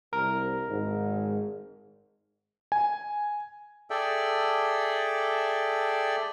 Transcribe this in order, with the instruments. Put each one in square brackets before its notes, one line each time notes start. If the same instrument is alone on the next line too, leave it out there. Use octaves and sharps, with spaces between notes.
[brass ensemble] C2 [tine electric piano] A#4
[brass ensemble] G#1 G#2
[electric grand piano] G#5
[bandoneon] G#4 A4 D5 E5 G5